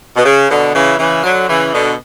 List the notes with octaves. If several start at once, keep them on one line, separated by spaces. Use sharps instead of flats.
B2
C#3
B2 D3
C#3 E3
C#3 E3
D3 F#3
C#3 E3
B2 D3